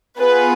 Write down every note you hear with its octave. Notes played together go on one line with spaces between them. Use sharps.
B3 F4 G#4 B4